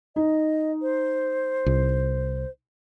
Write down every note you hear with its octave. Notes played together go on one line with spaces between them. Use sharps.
D#4 D#5
C5
C2